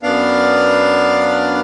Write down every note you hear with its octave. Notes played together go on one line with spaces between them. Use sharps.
F#2 B3 D4 F5